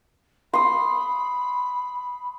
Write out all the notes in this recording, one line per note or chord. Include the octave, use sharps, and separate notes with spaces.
B5 C6 D#6